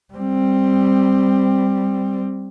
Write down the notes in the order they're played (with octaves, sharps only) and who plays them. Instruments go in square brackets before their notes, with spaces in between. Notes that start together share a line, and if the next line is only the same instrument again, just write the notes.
[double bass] G3 C4